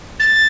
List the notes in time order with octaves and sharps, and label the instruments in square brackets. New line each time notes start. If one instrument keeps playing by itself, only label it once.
[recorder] A6